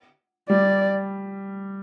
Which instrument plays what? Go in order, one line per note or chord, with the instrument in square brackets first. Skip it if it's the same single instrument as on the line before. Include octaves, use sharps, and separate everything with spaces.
[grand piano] G3 [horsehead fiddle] D5